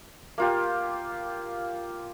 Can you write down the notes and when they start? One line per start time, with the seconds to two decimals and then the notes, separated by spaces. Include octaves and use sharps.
0.38 A#3 F4 G4